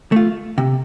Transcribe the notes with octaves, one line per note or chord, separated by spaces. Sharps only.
A3 F4
C3